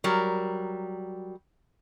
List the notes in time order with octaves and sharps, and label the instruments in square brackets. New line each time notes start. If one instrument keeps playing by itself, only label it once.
[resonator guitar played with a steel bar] F#3 G3 A#4